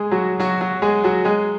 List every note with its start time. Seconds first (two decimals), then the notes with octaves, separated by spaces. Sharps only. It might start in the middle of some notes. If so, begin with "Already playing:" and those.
Already playing: G#3 G#4
0.11 F#3 F#4
0.40 F#3 F#4
0.61 F#3 F#4
0.82 G#3 G#4
1.04 F#3 F#4
1.25 G#3 G#4